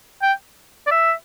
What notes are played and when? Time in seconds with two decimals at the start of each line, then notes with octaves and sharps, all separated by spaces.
0.22 G5
0.87 D5
0.91 E5